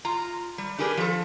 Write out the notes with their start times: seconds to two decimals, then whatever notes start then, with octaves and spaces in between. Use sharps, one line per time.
0.05 F4 A#5
0.58 G3
0.78 D4 G4 G#4 A#4 B4
0.97 F3 A4